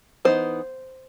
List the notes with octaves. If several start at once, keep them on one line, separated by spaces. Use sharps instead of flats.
E3 B3 D#4 C5